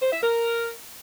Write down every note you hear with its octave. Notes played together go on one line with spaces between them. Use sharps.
C5
E5
A#4